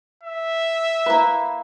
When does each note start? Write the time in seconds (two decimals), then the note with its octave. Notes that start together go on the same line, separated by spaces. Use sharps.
0.23 E5
1.06 A#3 E4 B4